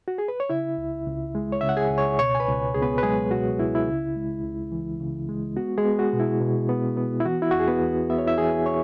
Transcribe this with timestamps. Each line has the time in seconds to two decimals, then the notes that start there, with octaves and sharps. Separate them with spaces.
0.08 F#4
0.18 G#4
0.28 B4
0.40 C#5
0.50 C#3 E4 E5
0.78 C#2
1.07 C#2
1.35 G#3
1.52 C#5
1.61 C#3 E5
1.69 F#5
1.77 G#4 G#5
1.91 C#2
1.98 C#5 C#6
2.19 B2 C#5 C#6
2.35 G#5
2.40 B4 B5
2.47 C#2
2.75 C#2 G#4
2.82 B3 B4
2.98 B4
3.03 F#3 G#3 G#4
3.31 B2 F#4
3.59 C#2 E4
3.75 E4
3.88 C#3
4.16 G#3
4.44 C#2
4.72 E3
5.00 C#3
5.29 G#3
5.56 B3 F#4
5.78 G#3 G#4
5.85 B3
5.99 F#4
6.13 B2
6.20 E4
6.41 B2
6.69 B3
6.97 B3
7.20 E4
7.25 E3 F#4
7.42 E4
7.51 E2 F#4
7.60 G#4
7.68 B3 B4
7.82 E2
8.10 B3 E5
8.18 C#5
8.27 E4 E5
8.38 E3 G#4 G#5
8.66 C#5 C#6